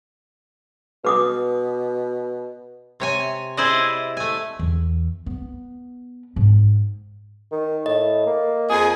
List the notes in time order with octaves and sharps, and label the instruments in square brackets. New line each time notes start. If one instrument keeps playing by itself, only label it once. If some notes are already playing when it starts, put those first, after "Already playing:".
[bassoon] B2 [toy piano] B4 D6 D#6
[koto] C3 C#5 G#5
E4 G#4 C5 D5 D#5
A3 G#5
[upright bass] E2
B3
G#2
[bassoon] D#3
[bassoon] A2 [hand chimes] D#5
[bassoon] A#3
[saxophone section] F2 G#4